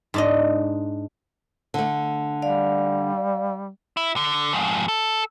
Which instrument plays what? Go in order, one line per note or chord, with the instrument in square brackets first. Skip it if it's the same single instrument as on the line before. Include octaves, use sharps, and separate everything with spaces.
[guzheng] G#2 D4 D#5
[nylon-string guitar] D3 A3
[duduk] G3 [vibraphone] D5 F5
[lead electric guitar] E4
D3
F2 G#2
A4